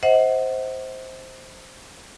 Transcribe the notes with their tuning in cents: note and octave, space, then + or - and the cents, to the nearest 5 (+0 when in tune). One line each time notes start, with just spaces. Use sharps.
C5 +0 D#5 +40 F#5 +0